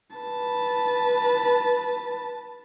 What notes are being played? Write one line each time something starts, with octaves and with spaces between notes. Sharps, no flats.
B4 A5